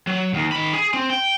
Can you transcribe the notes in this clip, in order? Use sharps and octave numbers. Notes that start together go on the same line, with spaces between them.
F#3
D#2
D#3 B5
G#4
C4
G5